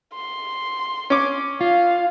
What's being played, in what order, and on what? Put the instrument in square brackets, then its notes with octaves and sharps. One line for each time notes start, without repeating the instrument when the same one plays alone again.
[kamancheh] C6
[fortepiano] C#4 D6
[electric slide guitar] F4 [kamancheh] F5